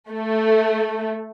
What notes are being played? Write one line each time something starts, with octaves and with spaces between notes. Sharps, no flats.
A3